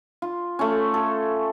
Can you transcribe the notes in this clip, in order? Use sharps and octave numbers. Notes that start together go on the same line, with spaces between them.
F4
A3 C#4
A4